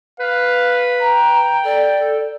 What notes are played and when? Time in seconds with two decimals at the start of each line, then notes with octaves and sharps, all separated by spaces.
0.20 B4 F5
0.99 G5 A#5
1.65 A4 D5
1.98 A4